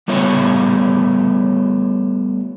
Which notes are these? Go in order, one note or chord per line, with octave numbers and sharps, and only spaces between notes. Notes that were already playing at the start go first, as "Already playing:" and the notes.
G3 A3 B3 F4 C#5 E5